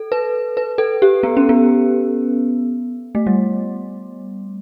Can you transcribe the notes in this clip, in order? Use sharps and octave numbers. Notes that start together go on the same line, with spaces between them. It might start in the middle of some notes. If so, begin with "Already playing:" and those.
Already playing: A4
B4
B4
A4
G4
B3
C#4
B3
A3
G3